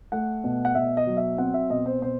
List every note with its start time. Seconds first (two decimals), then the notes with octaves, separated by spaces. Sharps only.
0.12 A3 F#5
0.44 B2
0.65 F#5
0.75 B2 E5
0.97 D#5
1.07 F#3
1.17 E5
1.38 C4 F#5
1.54 E5
1.70 B2 D#5
1.86 C5
2.01 B2 C5